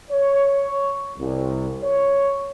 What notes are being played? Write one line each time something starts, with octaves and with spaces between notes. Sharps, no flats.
C#5
C2
C#5